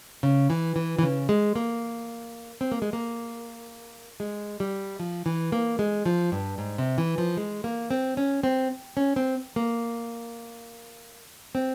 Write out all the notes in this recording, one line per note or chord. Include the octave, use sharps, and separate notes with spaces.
C#3
E3
E3
E3
C#3
G#3
A#3
C4
A#3
G#3
A#3
G#3
G3
F3
E3
A#3
G#3
F3
G2
G#2
C3
E3
F3
G#3
A#3
C4
C#4
C4
C#4
C4
A#3
C4